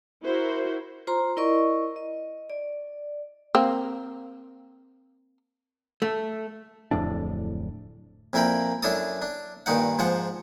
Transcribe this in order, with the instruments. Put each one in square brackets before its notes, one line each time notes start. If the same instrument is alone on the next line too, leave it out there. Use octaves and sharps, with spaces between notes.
[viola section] E4 F#4 A#4 C5
[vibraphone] F4 C5 A#5 C6
E4 A#4 D5 D#5 C#6
D#5
D5
[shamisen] A#3 C4
[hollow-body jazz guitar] A3
[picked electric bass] D1 F2 A2 D4
[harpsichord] F2 A#2 E4 A#4 G5 B5
F#2 D4 E4 A4 A5 D#6
D4
G2 A#2 D#3 D#4 F#5
G#2 F3 F4 F#5